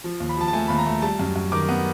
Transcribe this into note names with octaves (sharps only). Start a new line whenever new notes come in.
F3
D#2
B5
F3 A5
A5
A3 G#5
D#2 B5
A#5
A3
G3 A5
F#2
F#2
D#3 D6
B3